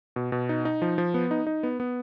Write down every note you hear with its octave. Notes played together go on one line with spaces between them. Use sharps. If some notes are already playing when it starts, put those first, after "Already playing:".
B2
B2
D#4
D#4
F3
F3
B3
D#4
D#4
B3
B3